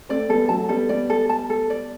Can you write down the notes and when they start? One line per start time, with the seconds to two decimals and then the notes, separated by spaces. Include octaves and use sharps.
0.09 A3 C4 D5
0.29 G3 B3 A4
0.49 F#3 A3 A5
0.69 G3 B3 A4
0.89 G3 B3 D5
1.10 A4
1.30 A5
1.50 A4
1.70 D5